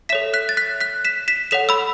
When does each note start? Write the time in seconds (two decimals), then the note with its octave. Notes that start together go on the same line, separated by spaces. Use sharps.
0.09 E5 B6 E7
0.13 A4 C#5
0.34 F#6 B6
0.49 A6
0.57 F#6 B6
0.80 F#6 B6
1.05 B6 E7
1.28 B6 E7
1.51 A4 C#5 F#5 B6 E7
1.69 B5 E6